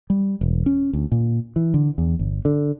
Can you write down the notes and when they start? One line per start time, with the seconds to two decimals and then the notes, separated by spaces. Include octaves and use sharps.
0.10 G3
0.41 E1
0.66 C#4
0.93 D2
1.12 A#2
1.56 E3
1.74 D3
1.98 E2
2.19 G1
2.45 D3